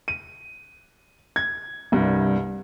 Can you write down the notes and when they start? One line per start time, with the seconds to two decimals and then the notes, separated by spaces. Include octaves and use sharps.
0.08 D#7
1.36 G#6
1.92 C2 G2 C3